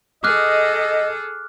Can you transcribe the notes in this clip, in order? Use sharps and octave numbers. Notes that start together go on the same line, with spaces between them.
G#4 A4 D#5 D6 F6 F#6